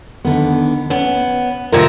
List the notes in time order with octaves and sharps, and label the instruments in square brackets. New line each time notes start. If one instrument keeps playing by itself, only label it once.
[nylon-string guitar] D3 D#3 B3
[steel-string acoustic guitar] B3 [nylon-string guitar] C#4
[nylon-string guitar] A2 D#3 F4 [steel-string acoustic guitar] C3 F3 A#4